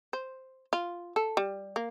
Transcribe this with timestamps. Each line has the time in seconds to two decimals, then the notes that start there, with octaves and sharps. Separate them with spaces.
0.13 C5
0.73 F4
1.16 A4
1.37 G3
1.76 A#3